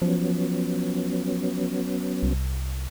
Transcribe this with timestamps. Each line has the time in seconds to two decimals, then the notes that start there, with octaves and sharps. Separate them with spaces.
0.02 F3 F#3 B3 C#4
2.23 C2